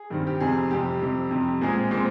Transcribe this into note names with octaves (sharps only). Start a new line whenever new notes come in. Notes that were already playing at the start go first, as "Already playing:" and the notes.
Already playing: G#4
G2 D#3 G3 C4
G4
F2 C3 G3 G#4
F2 C3 G3 G4
F2 C3 G3
F2 C3 G3
A#2 G#3 C4 G#4
A#2 G#3 C4